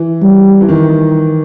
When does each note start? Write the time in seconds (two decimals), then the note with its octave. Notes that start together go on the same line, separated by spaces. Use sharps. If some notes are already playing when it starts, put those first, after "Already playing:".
Already playing: E3
0.22 G3
0.61 E3
0.68 D#3